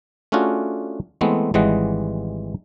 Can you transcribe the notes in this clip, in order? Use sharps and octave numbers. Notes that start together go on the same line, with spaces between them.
A3 C#4 D4 F4 F#4 G#4
E3 G#3 A3 B3 C4
G#1 E3 G3 G#3 D#5 F#5